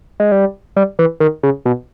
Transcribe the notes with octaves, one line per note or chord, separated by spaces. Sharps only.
G#3
G3
G3
E3
D#3
C#3
B2